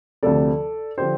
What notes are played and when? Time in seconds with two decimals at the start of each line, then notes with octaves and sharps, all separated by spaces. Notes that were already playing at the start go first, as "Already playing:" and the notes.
0.23 D2 C3 F3 A4 D5
0.98 D3 F3 G4 C5